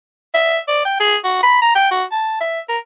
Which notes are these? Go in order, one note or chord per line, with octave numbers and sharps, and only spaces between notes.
E5
D5
G5
G#4
F#4
B5
A#5
G5
F#4
A5
E5
A#4